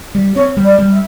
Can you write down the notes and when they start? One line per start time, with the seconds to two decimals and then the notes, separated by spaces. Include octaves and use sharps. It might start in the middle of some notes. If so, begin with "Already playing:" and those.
0.15 G3
0.35 C4 C#5
0.57 G3
0.64 D5
0.79 G3
0.92 E5